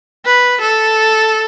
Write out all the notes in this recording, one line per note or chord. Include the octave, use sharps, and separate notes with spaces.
B4
A4